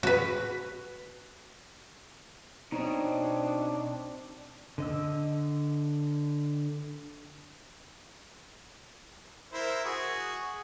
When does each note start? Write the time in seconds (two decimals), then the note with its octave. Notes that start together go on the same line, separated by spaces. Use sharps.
0.03 F#4 B4
2.72 B2 C4 D4 D#4 C#5 D#5
4.78 D3 D#5 E6
9.52 E4 A#4 C5
9.85 F#4 G#4